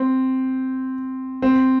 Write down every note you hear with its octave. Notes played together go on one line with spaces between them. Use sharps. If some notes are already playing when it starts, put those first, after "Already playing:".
Already playing: C4
C4